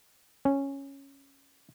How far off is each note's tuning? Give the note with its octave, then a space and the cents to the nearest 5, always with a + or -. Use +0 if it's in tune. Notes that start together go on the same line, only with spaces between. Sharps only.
C#4 -5